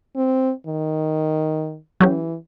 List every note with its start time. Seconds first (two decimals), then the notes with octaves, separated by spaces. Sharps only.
0.16 C4
0.67 D#3
2.01 E3 F#3 C#4 G4